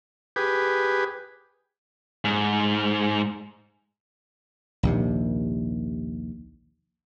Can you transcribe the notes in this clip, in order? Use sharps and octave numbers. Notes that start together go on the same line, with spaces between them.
G4 G#4 B4
G#2
A#1 D#2 C3